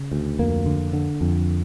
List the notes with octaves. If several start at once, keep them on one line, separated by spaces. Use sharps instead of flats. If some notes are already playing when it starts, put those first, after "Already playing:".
Already playing: C#3
D2
F2 A#3
D3
D3
F2